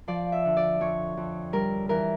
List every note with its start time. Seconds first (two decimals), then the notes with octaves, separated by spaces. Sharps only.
0.08 F3 D5
0.32 E5
0.45 D3
0.57 D5
0.80 F2 C#5
1.17 F2
1.53 G3 A#4
1.89 E3 A#4